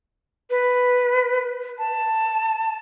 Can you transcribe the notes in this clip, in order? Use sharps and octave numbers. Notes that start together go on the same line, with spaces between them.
B4
A5